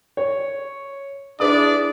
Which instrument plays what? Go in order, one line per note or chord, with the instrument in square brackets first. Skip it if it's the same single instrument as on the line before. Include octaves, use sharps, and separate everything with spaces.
[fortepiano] C#5
[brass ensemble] D4 [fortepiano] E4 B4 D#6 [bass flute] G#4 [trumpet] D5